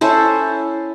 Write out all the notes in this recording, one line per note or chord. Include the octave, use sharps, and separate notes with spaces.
C#4 E4 A4 C5